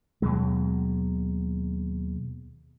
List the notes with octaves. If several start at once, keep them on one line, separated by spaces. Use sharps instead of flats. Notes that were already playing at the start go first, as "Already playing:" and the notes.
D#2 B2 F#3 G#3